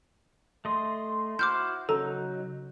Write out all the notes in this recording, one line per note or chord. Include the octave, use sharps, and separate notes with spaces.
A3 D#5 C6
E4 F#4 C5 D6 F6 G6
C#3 F#3 D#4 A4 A#5